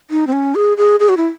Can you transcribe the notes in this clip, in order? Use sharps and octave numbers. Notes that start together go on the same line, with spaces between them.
D#4
C4
C#4
G#4
G#4
G#4
F#4
E4